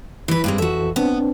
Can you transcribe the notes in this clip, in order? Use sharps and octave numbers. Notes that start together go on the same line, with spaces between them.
E3 E4 B4
G2 G#3 C4
F2 E3 F#4 A4 E5
B3 C4 D4